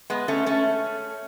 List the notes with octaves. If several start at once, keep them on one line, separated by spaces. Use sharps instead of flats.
G#3 B3
A3 C#4
A3 C#4